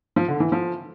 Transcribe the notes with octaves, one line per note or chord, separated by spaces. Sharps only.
F3
D3
E3
F3